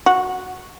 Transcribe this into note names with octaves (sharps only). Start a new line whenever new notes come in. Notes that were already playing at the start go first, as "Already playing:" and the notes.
F#4